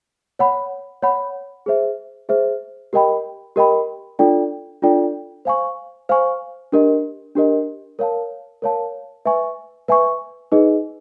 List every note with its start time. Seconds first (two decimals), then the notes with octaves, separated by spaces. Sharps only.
0.39 C#5 F#5 B5
1.02 C#5 F#5 B5
1.66 G#4 C5 E5
2.29 G#4 C5 E5
2.93 G4 A#4 D#5 G5 B5
3.56 G4 A#4 D#5 G5 B5
4.19 D4 F4 A4 D5 G5
4.82 D4 F4 A4 D5 G5
5.45 C5 F5 G#5 C#6
6.09 C5 F5 G#5 C#6
6.72 D4 G4 A#4 D#5
7.35 D4 G4 A#4 D#5
7.99 A#4 C#5 F5 A5
8.62 A#4 C#5 F5 A5
9.25 B4 E5 G#5 C#6
9.88 B4 E5 G#5 C#6
10.52 D#4 G#4 B4 D#5